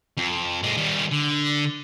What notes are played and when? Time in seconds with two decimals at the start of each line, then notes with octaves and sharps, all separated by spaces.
0.18 F2
0.63 A#2 G#3
0.77 D#3 G3
1.11 D3